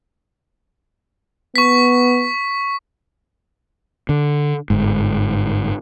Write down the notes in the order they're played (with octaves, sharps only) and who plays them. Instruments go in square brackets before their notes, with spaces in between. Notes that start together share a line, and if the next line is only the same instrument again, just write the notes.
[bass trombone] B3 [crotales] C#6 B6
[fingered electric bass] D3
G1 G#2